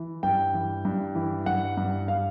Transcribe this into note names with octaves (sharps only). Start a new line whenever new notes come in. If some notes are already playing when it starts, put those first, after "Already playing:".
Already playing: E3
G2 G5
E3
G2
E3
G2 F#5
G2
F5